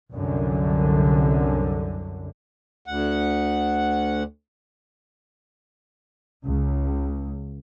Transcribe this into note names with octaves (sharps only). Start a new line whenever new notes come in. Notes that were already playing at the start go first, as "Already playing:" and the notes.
C2 F#2 D3
D2 F#5
C#2